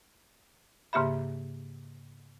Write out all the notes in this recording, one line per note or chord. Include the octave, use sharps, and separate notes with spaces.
G#2 C#3 A#3 G4 E5 B5